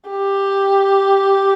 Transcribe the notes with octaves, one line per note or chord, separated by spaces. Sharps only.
G4